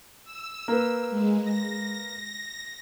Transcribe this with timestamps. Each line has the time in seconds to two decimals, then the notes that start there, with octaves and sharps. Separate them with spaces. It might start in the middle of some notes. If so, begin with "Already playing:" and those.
0.24 E6
0.68 A#3 B4
1.10 G#3
1.42 A#6